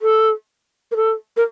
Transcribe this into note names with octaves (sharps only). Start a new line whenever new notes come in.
A4
A#4
A4
A#4